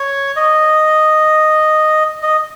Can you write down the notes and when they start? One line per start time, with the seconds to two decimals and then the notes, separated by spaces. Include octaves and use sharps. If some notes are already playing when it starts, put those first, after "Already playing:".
Already playing: C#5
0.36 D#5
2.23 D#5